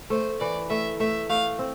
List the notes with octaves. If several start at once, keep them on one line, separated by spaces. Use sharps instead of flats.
A3 C5
E3 D5
A3 E5
A3 E5
A3 F5
C4